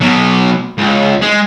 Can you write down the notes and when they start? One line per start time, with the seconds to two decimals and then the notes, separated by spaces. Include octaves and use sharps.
0.01 B2 F#3
0.78 C#2
1.22 G#3